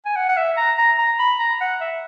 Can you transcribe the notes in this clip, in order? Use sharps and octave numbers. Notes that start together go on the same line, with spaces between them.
G#5
F#5
F#5
E5
A#5
A#5
A#5
B5
A#5
F#5
E5